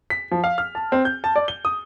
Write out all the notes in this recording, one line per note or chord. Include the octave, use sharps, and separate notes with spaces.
B6
F3
F5
F6
A5
C4
G6
A5
D5
G7
D#6